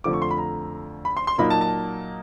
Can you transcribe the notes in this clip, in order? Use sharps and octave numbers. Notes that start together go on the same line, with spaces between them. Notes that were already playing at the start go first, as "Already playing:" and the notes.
F2 D3 F3 A3 D6
C#6
C6
B5
A#5
B5
C6
C6
A#2 F#3 A#3 D#4 B5
A5
A5